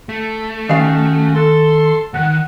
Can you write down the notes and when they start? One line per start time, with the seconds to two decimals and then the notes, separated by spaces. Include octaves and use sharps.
0.09 A3
0.69 D#3 C#4 F#4 F5
1.35 A4 C6
2.14 D#2 D#3 F#5